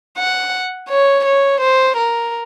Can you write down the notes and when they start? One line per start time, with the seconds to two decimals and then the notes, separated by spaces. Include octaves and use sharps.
0.18 F#5
0.89 C#5
1.25 C#5
1.61 C5
1.97 A#4